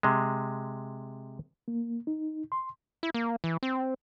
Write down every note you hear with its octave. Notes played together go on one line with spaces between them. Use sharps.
C3 G#3
A#3
D#4
C6
E4
A#3
E3
C4